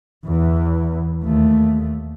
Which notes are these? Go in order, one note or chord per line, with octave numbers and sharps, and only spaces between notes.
E2 E3
D#2 A3